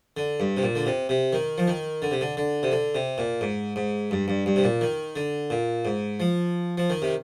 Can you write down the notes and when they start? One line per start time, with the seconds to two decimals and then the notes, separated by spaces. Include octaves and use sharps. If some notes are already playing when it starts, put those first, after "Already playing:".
0.17 D3
0.40 G2
0.57 C3
0.63 A#2
0.75 D3
0.86 C3
1.09 C3
1.33 D#3
1.58 F3
1.68 D#3
2.02 D3
2.11 C3
2.21 D3
2.37 D3
2.63 C3
2.72 D3
2.95 C3
3.18 A#2
3.41 G#2
3.76 G#2
4.11 G2
4.28 G2
4.46 G2
4.56 C3
4.64 A#2
4.81 D#3
5.16 D3
5.50 A#2
5.85 G#2
6.20 F3
6.78 F3
6.90 D#3
7.02 C3